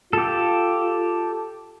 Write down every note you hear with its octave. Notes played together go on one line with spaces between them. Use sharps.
F4 G4 A4